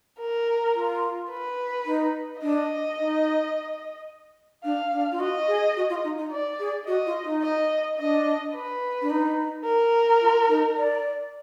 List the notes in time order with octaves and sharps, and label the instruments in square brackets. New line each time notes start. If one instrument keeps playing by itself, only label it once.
[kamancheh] A#4
[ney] F4
[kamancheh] B4
[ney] D#4
[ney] D4 [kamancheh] D#5
[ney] D#4
[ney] D4 [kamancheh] F5
[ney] D4
F4
[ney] F#4 [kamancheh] D#5
[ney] G#4
F#4
F4
D#4
D#4
[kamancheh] D5
[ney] G#4
[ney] F#4 [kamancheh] D#5
[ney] F4
D#4
[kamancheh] D#5
[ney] D4 [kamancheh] D#5
[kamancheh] B4
[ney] D4
D#4
[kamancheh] A#4
[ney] F4
D#4
D5